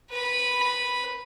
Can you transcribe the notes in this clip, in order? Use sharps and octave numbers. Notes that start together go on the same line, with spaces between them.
B4 B5